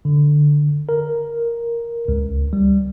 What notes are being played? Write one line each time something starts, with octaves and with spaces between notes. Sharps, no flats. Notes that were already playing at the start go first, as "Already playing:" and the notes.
D3
A#4
C#2
G3